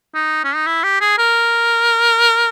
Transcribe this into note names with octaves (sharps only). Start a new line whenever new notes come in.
D#4
C#4
D#4
E4
G4
G#4
A#4